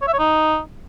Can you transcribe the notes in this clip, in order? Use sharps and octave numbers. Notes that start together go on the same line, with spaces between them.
C#5
E5
C#5
D#4